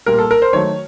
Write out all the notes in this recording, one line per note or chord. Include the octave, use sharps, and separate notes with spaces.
A#2 G3 A#3 A#4
A4
A#4
C5
D#3 F#3 A3 C#5